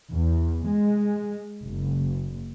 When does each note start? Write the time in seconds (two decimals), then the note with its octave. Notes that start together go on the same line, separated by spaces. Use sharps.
0.12 E2
0.68 G#3
1.65 F#1